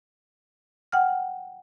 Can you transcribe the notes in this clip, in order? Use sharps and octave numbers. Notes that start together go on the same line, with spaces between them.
F#5 G5 F6